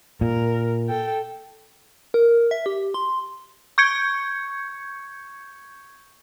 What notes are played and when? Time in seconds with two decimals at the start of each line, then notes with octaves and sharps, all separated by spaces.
0.21 A#2 A#4
0.89 A4 G5
2.14 A#4
2.51 E5
2.66 G4
2.94 C6
3.78 C#6 G6 G#6 C#7